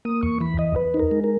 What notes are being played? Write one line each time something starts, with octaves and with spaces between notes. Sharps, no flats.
A#3 D#6
E2 C#6
E3 B5
E2 D#5
E2 B4
D#4
A#4
G#3
A#4